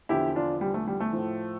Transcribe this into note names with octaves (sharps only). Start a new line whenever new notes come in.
E2 D3 F3 E4 G4
D4 F4
G3
A3
G3
A3
A2 F3